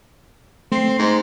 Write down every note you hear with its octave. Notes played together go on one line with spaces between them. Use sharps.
A3 C4 C7
G#2